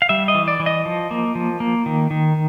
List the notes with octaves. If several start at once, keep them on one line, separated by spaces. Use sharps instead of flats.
F5
G3 E5
D#5
E3
D5
E3
D#5
F3
A#3
F3
A#3
D#3
D#3